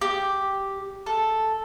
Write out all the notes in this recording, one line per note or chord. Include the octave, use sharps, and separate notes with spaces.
G4
A4